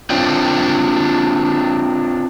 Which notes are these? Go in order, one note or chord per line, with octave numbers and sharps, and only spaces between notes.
C4 D4 F4 C5 D5 G5